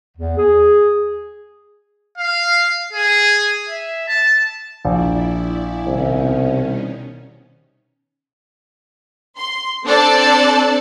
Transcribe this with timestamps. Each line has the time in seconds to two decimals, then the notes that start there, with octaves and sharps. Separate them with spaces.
0.17 E2
0.37 G#4
2.18 F5
2.93 G#4
3.69 E5
4.08 A5
4.85 A#1 E4 D5
5.87 C2 B2 D#3 C#4
9.37 C6
9.84 C4 D4 A4 C5 D5 A5